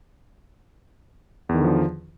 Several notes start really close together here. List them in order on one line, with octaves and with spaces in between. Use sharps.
E2 D#3 D3 F3